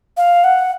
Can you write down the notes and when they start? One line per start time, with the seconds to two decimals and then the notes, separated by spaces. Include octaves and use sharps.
0.17 F5
0.44 F#5